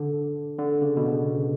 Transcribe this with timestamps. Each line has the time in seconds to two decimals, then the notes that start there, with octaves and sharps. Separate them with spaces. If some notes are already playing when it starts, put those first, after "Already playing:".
Already playing: D3
0.58 D3
0.82 C#3
0.97 B2
1.06 C#3